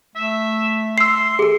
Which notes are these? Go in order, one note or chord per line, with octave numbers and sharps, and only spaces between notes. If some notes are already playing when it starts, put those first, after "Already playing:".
A3 E5
C6 E6 C7
G#4 A4